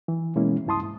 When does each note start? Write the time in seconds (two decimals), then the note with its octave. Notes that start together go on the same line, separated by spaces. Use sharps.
0.08 E3
0.36 B2 E3 G#3 A#3 C#4 E4
0.66 C#2 G2 E4 A5 C6 D#6
0.82 G#2